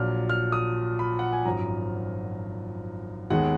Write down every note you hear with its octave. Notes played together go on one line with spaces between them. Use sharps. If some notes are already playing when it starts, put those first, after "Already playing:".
Already playing: A#1 A#2 F#3 F6
F6
D#6
B5
F#5
G#5
G#1 F#2 F3 A#5
D#2 D#3 G#3 B3 F#5